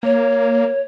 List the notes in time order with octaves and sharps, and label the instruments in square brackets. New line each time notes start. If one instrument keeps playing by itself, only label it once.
[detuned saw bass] A#3 [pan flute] C#5